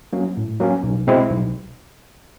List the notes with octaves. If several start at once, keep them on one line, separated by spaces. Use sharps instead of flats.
F#3 A#3 C#4
A2
F#3 A#3 C#4
B1
B2 G#3 C4 E4
B1